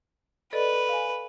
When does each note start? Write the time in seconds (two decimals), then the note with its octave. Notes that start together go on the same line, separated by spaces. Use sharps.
0.53 A4 B4 D5 D#5
0.89 F5 G#5